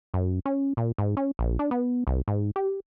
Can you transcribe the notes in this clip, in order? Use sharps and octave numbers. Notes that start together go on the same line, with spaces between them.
F#2
C#4
A#2
G#2
C#4
A#1
D4
B3
C2
G#2
G4